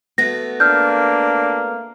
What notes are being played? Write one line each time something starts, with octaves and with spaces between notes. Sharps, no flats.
A3 B3 F#4 A#6
A#3 D4 F6 G6